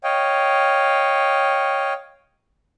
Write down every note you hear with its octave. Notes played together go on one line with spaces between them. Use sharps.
C#5 D#5 F5 G5